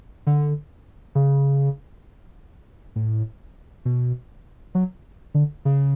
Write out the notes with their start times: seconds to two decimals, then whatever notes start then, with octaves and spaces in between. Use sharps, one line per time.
0.27 D3
1.15 C#3
2.96 A2
3.85 B2
4.75 F#3
5.35 D3
5.65 C#3